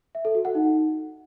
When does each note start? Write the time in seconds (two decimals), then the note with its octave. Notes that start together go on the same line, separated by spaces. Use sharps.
0.15 E5
0.25 A4
0.35 F#4
0.45 F#5
0.55 D#4